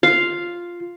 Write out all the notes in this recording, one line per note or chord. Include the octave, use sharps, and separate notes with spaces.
F4 F5